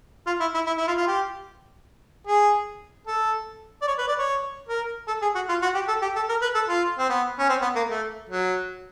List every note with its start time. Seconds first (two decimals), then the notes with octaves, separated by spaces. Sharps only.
0.27 F4
0.40 E4
0.54 E4
0.67 E4
0.78 E4
0.87 F4
0.98 F4
1.07 G4
2.27 G#4
3.07 A4
3.82 D5
3.87 C#5
3.98 B4
4.08 D5
4.19 C#5
4.69 A#4
5.08 A4
5.22 G#4
5.35 F#4
5.49 F4
5.62 F#4
5.75 G4
5.88 A4
6.02 G4
6.16 A4
6.29 A#4
6.42 B4
6.55 A4
6.69 F4
6.99 C4
7.09 B3
7.39 C#4
7.49 C4
7.62 B3
7.76 A#3
7.90 A3
8.29 F#3